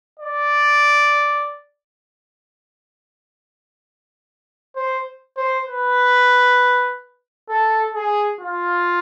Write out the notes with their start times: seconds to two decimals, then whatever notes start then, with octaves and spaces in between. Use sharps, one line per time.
0.20 D5
4.76 C5
5.37 C5
5.67 B4
7.49 A4
7.95 G#4
8.41 F4